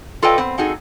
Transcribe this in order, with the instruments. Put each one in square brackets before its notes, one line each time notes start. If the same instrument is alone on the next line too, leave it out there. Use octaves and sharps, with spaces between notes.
[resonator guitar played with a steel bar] F4 A4 B4 D5 D#5 G5
B3 C4
C4 D#4 F#4 G#4 A4